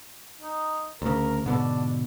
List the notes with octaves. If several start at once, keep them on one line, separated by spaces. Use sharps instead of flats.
D#4
D2 C#3 A#4
G#2 B2 D3 D4